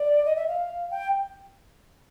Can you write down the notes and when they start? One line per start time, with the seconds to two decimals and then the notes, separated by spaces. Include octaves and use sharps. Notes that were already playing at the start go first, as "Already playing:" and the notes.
Already playing: D5
0.25 D#5
0.36 E5
0.47 F5
0.90 G5